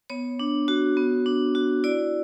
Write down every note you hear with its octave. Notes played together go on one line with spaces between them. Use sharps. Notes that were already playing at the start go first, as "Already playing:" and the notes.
B3 C#5
D4
F#4
B3
D4
F#4
E4 D5